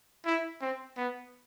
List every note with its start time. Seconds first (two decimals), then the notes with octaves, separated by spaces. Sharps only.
0.26 E4
0.61 C4
0.97 B3